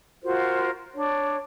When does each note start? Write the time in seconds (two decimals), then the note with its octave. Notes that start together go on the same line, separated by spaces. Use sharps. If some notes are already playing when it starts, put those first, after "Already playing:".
0.23 F4 F#4 A#4 C5
0.95 D4 C#5